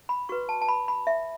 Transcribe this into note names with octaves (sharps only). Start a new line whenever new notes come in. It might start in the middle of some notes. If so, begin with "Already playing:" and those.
B5
F#4 B4 C#6
A5
A5
B5
B5
E5